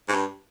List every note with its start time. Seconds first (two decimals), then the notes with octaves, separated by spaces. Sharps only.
0.09 G#2
0.14 G2